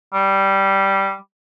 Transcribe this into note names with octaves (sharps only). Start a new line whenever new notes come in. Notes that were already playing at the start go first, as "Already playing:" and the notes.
G3